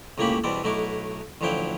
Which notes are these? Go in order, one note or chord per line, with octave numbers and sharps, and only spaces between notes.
C#2 A2 A#3 C#4 G4 B5
E2 B2 G3 C4 D5
B1 F#3 A3 D#4 E4 D6
A1 D2 F3 F#3 E4 G5